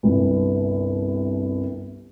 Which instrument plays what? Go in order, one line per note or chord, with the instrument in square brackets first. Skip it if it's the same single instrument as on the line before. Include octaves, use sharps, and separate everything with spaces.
[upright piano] G1 C2